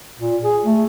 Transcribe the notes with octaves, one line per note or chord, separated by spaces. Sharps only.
A#2
G#4
A3